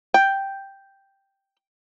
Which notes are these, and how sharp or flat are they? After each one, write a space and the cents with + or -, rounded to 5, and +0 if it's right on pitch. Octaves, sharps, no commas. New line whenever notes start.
G5 +0